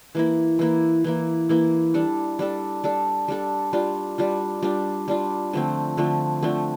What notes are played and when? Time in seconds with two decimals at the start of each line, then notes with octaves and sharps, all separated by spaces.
0.15 E3 A#3 E4
0.59 E3 A#3 E4
1.04 E3 A#3 E4
1.49 E3 A#3 E4
1.94 G3 D4 A4
2.39 G3 D4 A4
2.84 G3 D4 A4
3.28 G3 D4 A4
3.73 G3 D4 F4
4.18 G3 D4 F4
4.63 G3 D4 F4
5.08 G3 D4 F4
5.53 D3 F3 A3 C4
5.97 D3 F3 A3 C4
6.43 D3 F3 A3 C4